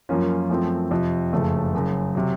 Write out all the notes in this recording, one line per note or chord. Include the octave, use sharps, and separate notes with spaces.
F#2 F3 A#3 C#4 F4
F#2 F3 A3 C4
F2 C3 F3
F#1 F2 C#3 A3
F#1 F#2 C#3
C3 F#3